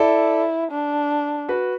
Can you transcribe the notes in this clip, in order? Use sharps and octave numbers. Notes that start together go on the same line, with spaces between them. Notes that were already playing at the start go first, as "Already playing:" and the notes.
Already playing: E4 A4 D5
D4
F#4 B4